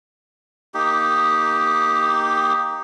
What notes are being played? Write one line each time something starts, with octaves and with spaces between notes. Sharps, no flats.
A#3 D#4 G4